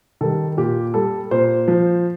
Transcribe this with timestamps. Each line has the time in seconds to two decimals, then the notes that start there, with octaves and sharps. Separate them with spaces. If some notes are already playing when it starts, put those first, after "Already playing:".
0.21 D#3 G3 A4
0.57 A#2 G4
0.94 G3 A4
1.31 A#2 C5
1.68 F3